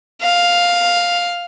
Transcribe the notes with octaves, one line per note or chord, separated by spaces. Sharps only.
F5